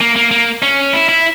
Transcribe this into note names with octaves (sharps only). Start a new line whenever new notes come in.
A#3
A#3
A#3
C#4
E4
E4